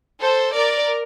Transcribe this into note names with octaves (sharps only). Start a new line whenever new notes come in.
A4 C5
A#4 D5